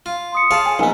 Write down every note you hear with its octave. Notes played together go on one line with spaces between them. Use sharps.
F4
C6 D#6 C#7
F4 G#4 C#5 F5 A5
G#5
A#1 B3 D#4 A#4 B4 G#5